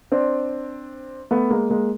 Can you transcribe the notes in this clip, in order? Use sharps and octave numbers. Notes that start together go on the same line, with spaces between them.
C4 D4
A3 B3
G#3 A#3
G#3 A#3